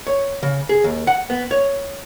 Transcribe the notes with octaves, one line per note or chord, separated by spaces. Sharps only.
C#5
C#3
G#4
D#2
F#5
B3
C#5